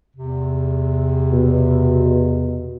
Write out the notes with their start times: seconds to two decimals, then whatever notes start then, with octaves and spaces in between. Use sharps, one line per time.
0.14 E2 C3
1.33 B2